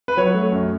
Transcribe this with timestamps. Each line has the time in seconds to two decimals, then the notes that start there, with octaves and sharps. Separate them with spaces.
0.08 B4
0.17 F#3 C#5
0.34 A3
0.52 F#2